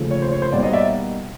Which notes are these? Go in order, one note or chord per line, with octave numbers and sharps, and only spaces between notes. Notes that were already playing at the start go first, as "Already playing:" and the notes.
Already playing: D#2 C#3 F3 A3
C#5
C5
C#5
C5
B2 G3 A#3 D#4 C5 D5
C#5 D#5
D5 E5